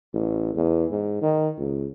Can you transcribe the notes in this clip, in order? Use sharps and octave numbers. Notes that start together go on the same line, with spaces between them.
A1
E2
G#2
D#3
C#2